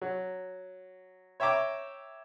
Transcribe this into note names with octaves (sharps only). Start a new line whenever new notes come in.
F#3
C#5 E5 G5 A#5 D6